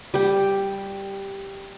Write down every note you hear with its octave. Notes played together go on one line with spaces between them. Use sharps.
G3 G5